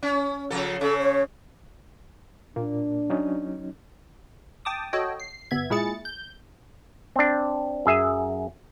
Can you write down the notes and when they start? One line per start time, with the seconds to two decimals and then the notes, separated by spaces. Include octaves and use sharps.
0.03 C#4
0.50 C#3 F3 A4
0.81 C#3 C#4 A4
0.99 C#5
2.56 A#2 A#3 D4
3.10 F#3 C#4 D#4
4.65 G5 A5 D6 D#6
4.93 F#4 A4 C#5 D#5 G5
5.20 C7
5.51 G1 B3 E5 G#6
5.70 A#2 G#3 E4 G#4 A6 C#7
6.05 G6
7.16 C4 D4
7.86 F#2 G#4 E5 G#5